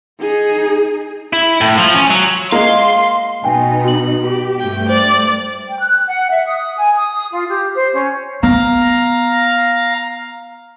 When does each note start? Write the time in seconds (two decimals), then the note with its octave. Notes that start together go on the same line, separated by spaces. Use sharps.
0.20 D#4 G#4
1.33 E4
1.61 A2
1.78 F3
1.94 C#4
2.10 F#3
2.52 G#3 A#3 F5 C6
3.44 B2 B3 D#4 G5 G#5
3.84 F#4 F#7
4.24 G4
4.60 G2 A3 G5
4.89 C5 D5
5.68 G5
5.80 F#6
6.06 F#5
6.31 E5
6.46 D#6
6.76 G#5
6.96 D#6
7.33 F4
7.49 G4
7.73 C5
7.93 C#4
8.43 B3 F5 A#5